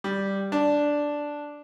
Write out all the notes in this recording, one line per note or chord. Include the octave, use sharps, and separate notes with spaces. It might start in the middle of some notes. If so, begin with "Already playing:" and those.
G3
D4